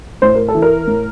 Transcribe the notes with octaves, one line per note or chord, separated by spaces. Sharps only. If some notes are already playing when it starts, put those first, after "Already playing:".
A2 C5
A#4
A4
E3
A#4
A2